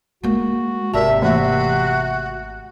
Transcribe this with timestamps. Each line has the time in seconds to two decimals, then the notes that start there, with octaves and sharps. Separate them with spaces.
0.23 G#3 A#3 F#4
0.94 G#1 C3 A#4 D5 E5 A5
1.22 E3 A3 A#3 F#4